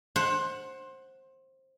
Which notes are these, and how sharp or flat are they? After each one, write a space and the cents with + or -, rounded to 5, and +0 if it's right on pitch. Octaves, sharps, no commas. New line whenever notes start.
C5 +20 F#5 +0